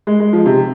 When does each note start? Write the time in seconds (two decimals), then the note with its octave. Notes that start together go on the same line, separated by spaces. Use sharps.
0.07 G#3
0.20 G#3
0.33 F3
0.46 C3